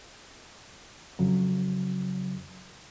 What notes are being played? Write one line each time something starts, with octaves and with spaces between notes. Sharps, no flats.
F2 C#3 F#3